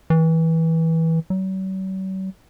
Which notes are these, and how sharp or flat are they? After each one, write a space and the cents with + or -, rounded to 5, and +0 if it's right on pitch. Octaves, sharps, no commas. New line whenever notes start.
E3 -20
F#3 +45